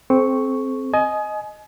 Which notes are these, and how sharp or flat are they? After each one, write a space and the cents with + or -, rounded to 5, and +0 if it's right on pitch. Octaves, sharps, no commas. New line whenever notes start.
C4 +0 A4 -45 C#6 +0
D#5 +0 G#5 +30